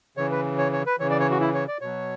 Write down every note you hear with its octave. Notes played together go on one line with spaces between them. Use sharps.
C#3 E3 C#5
B4
C#5
C#5
B4
C#3 E3 C#5
D5
C#5
F#4
E4
C#5
D5
B2 F#3 C#5